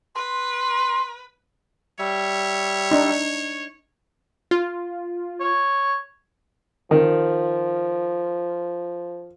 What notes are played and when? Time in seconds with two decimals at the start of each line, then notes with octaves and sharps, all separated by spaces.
0.15 B4 C6
1.99 G3 C#5 E5
2.91 D4 D#4
4.51 F4
5.41 C#5
6.91 D#3 F3